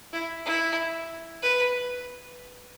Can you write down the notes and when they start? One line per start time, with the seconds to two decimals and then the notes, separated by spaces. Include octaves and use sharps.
0.13 E4
0.45 E4
1.42 B4